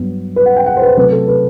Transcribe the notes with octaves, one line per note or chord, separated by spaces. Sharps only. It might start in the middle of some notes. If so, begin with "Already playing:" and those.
Already playing: G2 F#3 B3
B4
F#5
G5
F#5
C5
B4
C5
C3 F#3 A3 B4
A4
B4